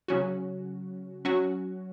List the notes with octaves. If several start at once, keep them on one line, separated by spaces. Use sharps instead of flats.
C#3 F#3 C#4 F#4
F#3 C#4 F#4